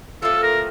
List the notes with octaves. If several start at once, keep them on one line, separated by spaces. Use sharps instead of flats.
A2 A3 C4 F4 A4
A#4